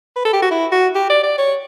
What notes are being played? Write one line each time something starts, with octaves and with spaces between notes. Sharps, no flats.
B4
A4
G4
F#4
E4
F#4
G4
D5
D5
C#5